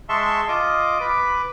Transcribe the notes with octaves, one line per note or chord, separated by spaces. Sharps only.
G#3 E5 A5 C6 C#6
F4 D#5 D6
B4 D6